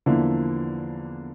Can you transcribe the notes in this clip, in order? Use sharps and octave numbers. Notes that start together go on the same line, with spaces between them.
E2 D3 F3 A#3 E4